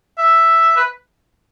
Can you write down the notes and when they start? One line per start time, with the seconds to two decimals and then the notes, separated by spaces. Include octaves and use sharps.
0.18 E5
0.77 B4